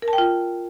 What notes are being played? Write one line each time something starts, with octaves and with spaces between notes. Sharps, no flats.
A#4
A5
G5
F4